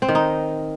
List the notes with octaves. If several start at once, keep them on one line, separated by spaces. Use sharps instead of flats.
C4
D#3
D#4